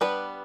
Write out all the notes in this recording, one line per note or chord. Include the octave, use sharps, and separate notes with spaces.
G3 B3 D4 B4